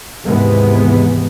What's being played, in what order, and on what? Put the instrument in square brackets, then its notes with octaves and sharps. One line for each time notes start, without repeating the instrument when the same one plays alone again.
[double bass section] D#2 G#2 C3 E3 G#3 B3